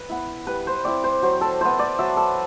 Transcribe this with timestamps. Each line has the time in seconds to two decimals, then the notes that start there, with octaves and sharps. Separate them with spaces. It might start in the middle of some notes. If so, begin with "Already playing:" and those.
Already playing: B4
0.09 B3 E4
0.47 G3 B4
0.67 C5
0.84 C4 E4 D5
1.04 C5
1.22 F#3 C5
1.41 A4
1.60 B3 E4 C5
1.79 D5
1.99 F#3 E5
2.17 A4